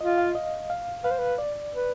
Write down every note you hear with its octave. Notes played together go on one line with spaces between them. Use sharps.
F4 D#5
F5
D#5
F5
B4 F5
C5
B4
D5
B4